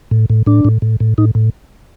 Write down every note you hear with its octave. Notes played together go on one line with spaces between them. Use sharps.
A2
A2
A2 D4
A2
A2
A2
A2 D#4
A2